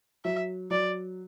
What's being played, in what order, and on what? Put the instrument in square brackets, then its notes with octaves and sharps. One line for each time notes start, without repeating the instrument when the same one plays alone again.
[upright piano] F#3 [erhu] E5
[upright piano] F#3 [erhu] D5